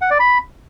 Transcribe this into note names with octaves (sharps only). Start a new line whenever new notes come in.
F#5
D5
B5